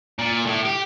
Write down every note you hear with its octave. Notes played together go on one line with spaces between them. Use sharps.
A#2
A2
G4